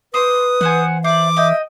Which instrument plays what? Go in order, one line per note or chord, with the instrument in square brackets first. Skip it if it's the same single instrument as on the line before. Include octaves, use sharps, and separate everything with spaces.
[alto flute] B4 [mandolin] C5 C6 D6 [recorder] D#6
[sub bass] E3 [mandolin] G#4 C5 F#5
[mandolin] C5 D5 [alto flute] E5 [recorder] D6
[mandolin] D#5 G5 [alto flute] E5